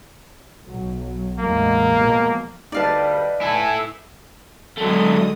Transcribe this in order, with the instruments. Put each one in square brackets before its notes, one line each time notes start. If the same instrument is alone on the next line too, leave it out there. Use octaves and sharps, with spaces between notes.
[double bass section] B1 F#3
[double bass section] A1 E2 G#3 [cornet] A#3
[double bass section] B2 F3 G#3
[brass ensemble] D2 G3 [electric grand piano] D#4 B4 [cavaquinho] D5 F5 A5
[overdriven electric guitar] E4 A4 [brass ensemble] G#5
[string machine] D3 G#3 D#6 [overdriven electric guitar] F#3 A3